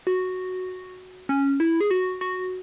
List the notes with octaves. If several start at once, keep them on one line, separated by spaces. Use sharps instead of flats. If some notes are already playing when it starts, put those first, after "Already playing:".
F#4
C#4
E4
G#4
F#4
F#4